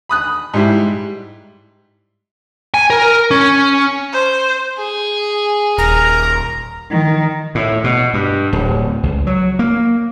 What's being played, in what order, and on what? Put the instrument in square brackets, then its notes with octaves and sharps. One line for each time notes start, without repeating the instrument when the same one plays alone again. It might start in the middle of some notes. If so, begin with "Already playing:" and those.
[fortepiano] B5 D#6 F#6
G#2 G3 E4
[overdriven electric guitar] G#5
A#4
C#4
[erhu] C5
[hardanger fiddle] G#4
[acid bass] D#1 [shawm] A#4 [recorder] A#5
[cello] D#3
[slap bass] A2
B2
G2
D1
C#2
F#3
A#3